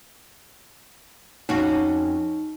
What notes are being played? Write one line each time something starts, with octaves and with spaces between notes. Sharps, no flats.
F2 C#4 D#4 F#4